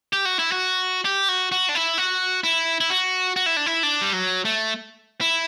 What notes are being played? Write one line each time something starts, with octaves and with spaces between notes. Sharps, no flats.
G4
F#4
E4
F#4
G4
F#4
F#4
D4
E4
F#4
E4
E4
F#4
F#4
E4
D4
E4
D4
G3
F#3
A3
E4